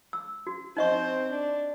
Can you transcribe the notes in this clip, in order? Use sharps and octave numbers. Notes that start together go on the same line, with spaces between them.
E6
F#4
C4 D#4 C5 D#5 C#6
D4